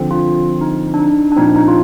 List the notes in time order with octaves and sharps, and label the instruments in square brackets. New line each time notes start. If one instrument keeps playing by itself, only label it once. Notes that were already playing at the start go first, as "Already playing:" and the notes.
Already playing: [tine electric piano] D3 F3 C4
[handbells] F4
D#4
D4
D#4
D4
[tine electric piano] A#2 F3 C4 [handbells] D#4
[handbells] D#4
F4